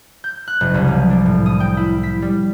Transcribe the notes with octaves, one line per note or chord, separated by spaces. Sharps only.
G6
F#6
F#1
C2
F3
D4
A2
D#6
G5
E4
B6
G3